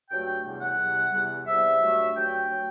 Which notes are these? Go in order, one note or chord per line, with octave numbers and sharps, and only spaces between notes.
G2 F#3 A3 G5
G5
E2 C3 G3
F#5
E2 C3 G3
E2 C3 G3
E2 C3 G3 E5
G2 F#3 A3
G2 F#3 A3 G5
F#3 A3